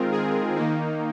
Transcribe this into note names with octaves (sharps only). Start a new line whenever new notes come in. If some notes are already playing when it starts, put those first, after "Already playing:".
Already playing: D#3 G#3 C4 F4 A#4
G#4
D#3 A#3 D#4